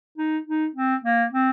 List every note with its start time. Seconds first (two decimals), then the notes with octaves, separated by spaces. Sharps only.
0.18 D#4
0.47 D#4
0.75 C4
1.04 A#3
1.32 C4